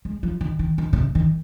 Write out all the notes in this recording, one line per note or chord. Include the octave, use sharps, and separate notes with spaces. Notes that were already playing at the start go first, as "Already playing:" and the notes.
G#3
F3
D#3
D#3
D#3
C3
C#3
D#3